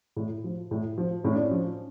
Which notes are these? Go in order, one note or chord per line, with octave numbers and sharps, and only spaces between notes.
A2
F3
A2
F3
A2 C#4
D4
C#4
F3